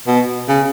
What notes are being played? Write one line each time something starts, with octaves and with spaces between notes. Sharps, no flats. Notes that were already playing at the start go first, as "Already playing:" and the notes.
B2
C#3